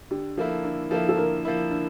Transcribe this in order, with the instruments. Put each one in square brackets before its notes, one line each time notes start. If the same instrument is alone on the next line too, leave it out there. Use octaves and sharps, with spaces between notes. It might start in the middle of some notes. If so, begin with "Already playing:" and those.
[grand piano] D3 [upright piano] G4
[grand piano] F3 A#3 E4 [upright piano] A4
[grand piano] D3
[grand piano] F3 A#3 E4 [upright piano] A4
[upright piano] A4
[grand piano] D3 [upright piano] A#4
[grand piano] F3 A#3 E4
D3